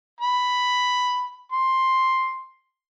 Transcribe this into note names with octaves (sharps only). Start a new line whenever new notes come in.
B5
C6